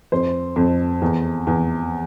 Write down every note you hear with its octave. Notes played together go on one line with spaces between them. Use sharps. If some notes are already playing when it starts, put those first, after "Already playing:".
F2 C5
F2
E2
E2